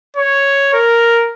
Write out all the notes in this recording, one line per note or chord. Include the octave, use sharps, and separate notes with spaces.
C#5
A#4